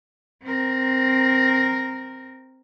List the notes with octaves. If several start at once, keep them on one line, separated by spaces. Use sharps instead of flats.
C4 A#4